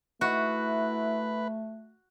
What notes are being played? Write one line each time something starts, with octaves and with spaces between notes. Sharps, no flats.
A3 E4 F#4 B4